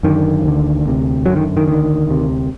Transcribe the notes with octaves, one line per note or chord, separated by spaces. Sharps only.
F#2 D3 D#3
D2 D3
D2 C3
F#2 D3 F#3
D#3
D#3
D2 D3 D#3
D2 C3